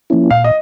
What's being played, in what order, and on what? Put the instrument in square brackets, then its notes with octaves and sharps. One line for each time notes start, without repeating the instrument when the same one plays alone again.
[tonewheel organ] F3 A#3 C#4 E4
[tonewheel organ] A#2 [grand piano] F5
[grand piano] D#5